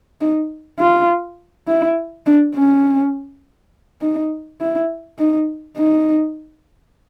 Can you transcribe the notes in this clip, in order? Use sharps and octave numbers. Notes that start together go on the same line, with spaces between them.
D#4
F4
E4
D4
C#4
D#4
E4
D#4
D#4